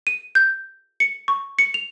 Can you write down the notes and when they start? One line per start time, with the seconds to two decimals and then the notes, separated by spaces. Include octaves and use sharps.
0.07 D#7
0.35 G6
1.00 C#7
1.28 C#6
1.59 C#7
1.74 F7